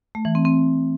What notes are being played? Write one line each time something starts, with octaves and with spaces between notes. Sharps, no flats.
A3
E3
C4
C4